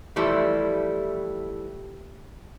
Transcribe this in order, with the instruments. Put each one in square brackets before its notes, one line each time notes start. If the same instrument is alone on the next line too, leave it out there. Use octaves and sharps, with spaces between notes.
[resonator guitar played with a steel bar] E3 F3 G3 A3 E4